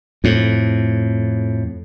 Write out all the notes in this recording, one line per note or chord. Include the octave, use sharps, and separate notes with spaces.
F2 A2